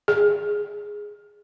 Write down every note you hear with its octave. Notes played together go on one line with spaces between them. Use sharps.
G#4